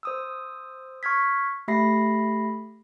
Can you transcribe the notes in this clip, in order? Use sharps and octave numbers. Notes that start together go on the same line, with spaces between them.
C5 D#6 E6
C#6 F6 G#6 B6
A3 G4 E5 B5 A#6 C7